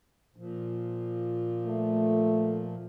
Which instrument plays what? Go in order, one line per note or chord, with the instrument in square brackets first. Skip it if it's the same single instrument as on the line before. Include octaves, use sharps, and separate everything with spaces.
[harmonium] A#2 F3
[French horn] A3